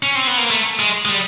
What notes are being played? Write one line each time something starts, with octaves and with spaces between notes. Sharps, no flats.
C#4
C4
B3
A#3
A3
G#3
G#3
G3